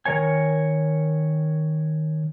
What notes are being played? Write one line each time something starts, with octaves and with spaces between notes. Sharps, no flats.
D#3 A#4 C#5 G#5